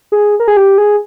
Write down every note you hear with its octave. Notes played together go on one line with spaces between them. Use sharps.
G#4
A#4
G#4
G4
G#4